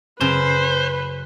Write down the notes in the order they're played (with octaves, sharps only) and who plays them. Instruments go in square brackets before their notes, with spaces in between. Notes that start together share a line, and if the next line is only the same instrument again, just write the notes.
[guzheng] F#2 C#3 [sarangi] B4 [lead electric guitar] C5